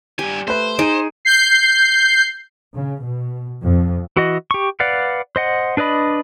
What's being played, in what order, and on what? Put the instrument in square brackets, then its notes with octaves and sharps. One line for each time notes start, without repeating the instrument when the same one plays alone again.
[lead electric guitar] G2 G#5 [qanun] G4
[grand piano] A3 B4 [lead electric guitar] C5
[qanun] D#4 G#4 [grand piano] D7 D#7
[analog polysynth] G6 C7
[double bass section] C#3
B2
F2
[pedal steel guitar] E3 F#4 D#5
G4 C#6
B4 D5 F5 F#5
C5 D#5 F#5
D4 B4 D5 D#5 B5